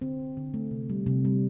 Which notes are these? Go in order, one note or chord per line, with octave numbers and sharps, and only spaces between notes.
D3 C4
D3
D3
A3
C3
G3
C3
G3